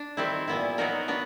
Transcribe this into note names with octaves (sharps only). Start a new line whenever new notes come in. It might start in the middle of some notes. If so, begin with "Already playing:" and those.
Already playing: D4
D#3 G3 C4 E4
A#2 G3 B3 E4
F#3 B3 D#4 F#4 A#4
B3 D4 F#4